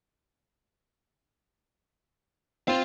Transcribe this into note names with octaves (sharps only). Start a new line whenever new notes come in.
C4 F4 F5